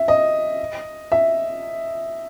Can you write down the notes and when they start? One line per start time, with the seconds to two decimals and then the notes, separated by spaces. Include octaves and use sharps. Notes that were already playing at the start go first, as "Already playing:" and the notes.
Already playing: E5
0.08 D#5
1.12 E5